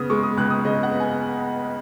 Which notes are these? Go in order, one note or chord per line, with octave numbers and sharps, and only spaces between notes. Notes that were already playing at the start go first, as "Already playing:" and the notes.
Already playing: C#3 B3 D#6
G#3 C#6
D#6
C#2 F#6
D#6
C#3 D#5
F#5
B3
G#5